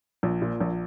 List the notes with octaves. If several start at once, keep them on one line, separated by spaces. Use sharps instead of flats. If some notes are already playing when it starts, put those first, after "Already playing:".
A#1
A#2
A#1